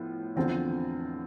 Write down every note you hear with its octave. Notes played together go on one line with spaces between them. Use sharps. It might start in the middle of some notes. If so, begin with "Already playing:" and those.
Already playing: A2 F3 B3 F4
E2 D3 F3 C4 F4